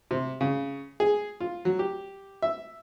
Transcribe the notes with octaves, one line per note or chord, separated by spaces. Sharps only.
C3
C#3
G#4
F4
F#3
G4
E5